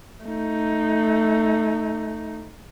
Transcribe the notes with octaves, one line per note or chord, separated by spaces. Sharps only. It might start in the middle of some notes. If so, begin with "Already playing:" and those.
A3 D#4